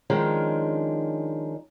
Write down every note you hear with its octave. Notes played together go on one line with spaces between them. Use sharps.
D#3 F3 G#3 C#4 D4